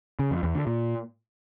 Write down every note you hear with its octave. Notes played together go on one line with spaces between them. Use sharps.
C#3
F2
E2
D3
A#2